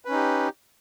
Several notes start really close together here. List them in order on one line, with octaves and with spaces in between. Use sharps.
B4 C#4 D#4 G4